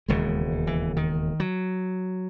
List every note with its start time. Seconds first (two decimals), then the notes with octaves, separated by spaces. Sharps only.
0.08 E1 D#2 C#3 G#3
0.67 E3
0.97 D#3
1.40 F#3